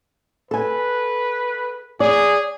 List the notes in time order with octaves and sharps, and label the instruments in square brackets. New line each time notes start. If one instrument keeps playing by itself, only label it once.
[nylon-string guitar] A4 G#5 [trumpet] B4
[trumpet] G#4 [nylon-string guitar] D5